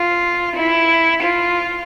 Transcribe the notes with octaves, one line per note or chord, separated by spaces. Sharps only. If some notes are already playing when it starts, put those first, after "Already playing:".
Already playing: F4
E4
F4